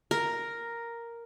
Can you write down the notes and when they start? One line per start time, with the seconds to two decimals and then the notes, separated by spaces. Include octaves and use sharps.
0.11 A#4